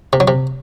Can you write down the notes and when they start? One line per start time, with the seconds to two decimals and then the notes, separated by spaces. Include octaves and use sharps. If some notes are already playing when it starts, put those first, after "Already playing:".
0.13 C3
0.20 F#3
0.28 C3